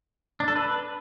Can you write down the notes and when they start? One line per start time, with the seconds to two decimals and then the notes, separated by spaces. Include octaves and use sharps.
0.40 D4
0.48 A4
0.56 B4